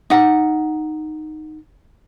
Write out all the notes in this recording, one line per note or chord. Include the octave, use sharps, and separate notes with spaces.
D#4 F#5